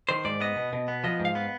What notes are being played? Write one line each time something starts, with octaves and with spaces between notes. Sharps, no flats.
D#3 C5
G#2 D5
B3 D#5
B2
B2
B3
F3 D#5
G#2
F5
B3